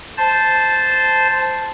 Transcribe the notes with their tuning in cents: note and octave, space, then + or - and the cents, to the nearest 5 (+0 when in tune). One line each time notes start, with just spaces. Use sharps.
C5 -5 A5 -5